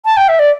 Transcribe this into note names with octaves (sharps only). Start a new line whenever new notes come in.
A5
G5
E5
D5